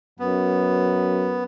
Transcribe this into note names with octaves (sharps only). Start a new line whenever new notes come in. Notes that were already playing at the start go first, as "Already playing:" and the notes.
F#2 B3